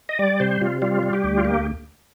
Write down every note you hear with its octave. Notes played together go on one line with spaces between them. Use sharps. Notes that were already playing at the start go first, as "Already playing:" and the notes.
D#5
G3 D5
C3 C5
C3 F4
G3 F4
G3
G4
D2
F4
A#3 G4